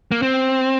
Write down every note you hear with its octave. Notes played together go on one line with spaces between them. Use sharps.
A#3
C4